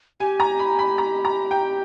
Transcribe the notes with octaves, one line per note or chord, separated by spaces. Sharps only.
G4 G#5
A#5
B5
B5
A#5
A#5
G5